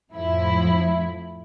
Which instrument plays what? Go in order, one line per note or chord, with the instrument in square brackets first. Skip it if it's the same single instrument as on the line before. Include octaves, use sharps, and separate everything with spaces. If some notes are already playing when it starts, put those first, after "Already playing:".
[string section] F2 A2 F3 E4